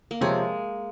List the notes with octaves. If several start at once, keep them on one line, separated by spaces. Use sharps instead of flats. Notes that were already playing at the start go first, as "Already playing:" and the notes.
A#3
C3 F3 G#3 C4 G4 C#5